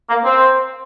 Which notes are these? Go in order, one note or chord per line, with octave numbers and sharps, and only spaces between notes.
A#3
C4